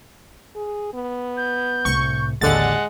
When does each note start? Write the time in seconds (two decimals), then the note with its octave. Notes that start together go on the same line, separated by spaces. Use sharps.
0.56 G#4
0.94 B3
1.37 G6
1.85 C2 A2 C#6
2.41 A1 D#2 D3 G#3 F#5 A6